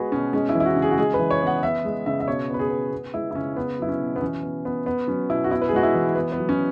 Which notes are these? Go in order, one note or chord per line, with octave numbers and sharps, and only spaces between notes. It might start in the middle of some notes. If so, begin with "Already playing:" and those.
Already playing: G#3 B3 F#4 G#4 B4
B2 C#4
G#3 C#4
E4
E3
E4
F#4
C#3
G#4
F#4
G#3 G#4
B4
E3
C#5
B3
F#5
B3 E5
G#3
C#3 E5
E5
B2 C#5
B3 B4
G#4
B3
B3
G#3 E4
E4
C#3 C#4
B3
F#3 E4
C#4
B2
B3
E3 C#4
B3
B3
B3
F#3 C#4
B2 E4
F#4
B3 E4
B4
G#4
G#3 F#4
E4
E3
B3
B3
F#3
C#4